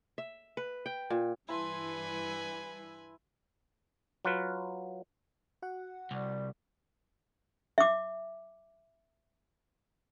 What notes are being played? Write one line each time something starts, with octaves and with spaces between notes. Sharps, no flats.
E5
B4
G5
A#2
G2 E3 E4 B4 G#5 A5 C6
F#3 F4 B4
F#4 F#5
C2 G3
E5 D6